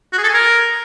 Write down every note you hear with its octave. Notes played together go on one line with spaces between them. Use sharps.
F#4
G#4
A4
G#5
A#4